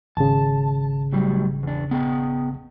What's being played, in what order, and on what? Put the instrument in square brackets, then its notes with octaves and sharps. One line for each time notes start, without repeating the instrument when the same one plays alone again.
[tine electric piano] G#1 C#3 [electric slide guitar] A5
[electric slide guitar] A2 F#3 G3
E2 D4
B3 G#4 G5